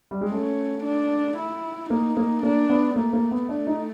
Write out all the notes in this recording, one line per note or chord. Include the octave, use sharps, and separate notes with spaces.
G3
G#3
A3 C#4
D4
E4
A#3 D#4
A#3
A#3 D4
B3
A3 A#3
A#3
B3
A3 D4
D#4